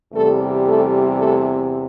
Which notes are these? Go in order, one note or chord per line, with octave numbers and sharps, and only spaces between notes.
E2 C3 G3 A3 A4
A3 A4
A3 A4